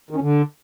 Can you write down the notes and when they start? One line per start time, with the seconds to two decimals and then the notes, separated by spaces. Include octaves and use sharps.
0.11 D#3
0.16 C#4
0.22 D3